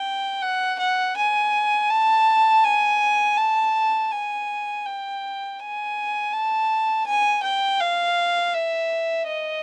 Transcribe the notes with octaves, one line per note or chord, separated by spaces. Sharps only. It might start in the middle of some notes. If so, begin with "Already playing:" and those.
Already playing: G5
F#5
F#5
G#5
A5
G#5
A5
G#5
G5
G#5
A5
G#5
G5
F5
E5
D#5